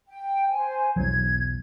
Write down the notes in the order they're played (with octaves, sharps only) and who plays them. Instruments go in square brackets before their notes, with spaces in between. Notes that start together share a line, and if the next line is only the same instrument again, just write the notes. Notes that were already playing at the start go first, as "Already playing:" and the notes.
[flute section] G5
C5 G#5
[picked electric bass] B1 E2 F#3 [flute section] G#6